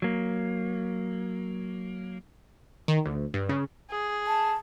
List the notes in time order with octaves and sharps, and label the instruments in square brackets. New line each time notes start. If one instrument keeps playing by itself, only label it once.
[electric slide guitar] F#3 A#3
[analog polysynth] D#3
D2
G2
C#3
[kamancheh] G#4
[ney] A5